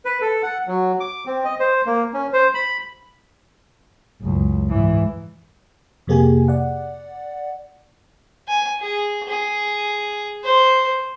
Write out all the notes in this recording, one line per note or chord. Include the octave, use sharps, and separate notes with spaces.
B4
A4
F#5
F#3
D6
C4
D#5
C5
A#3
C#4
C5
B5
F#1 C#2
G#2 E3
F2 C3 A#3 G4 G#4 G#5
D5 F#5
G#5
G#4
G#4
C5